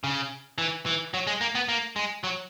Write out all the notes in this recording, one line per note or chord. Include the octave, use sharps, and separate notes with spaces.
C#3
E3
E3
F#3
G#3
A#3
B3
A#3
G#3
F#3